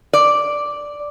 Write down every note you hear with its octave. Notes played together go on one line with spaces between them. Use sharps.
D5